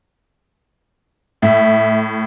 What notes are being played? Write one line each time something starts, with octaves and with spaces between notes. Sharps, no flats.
A2 E5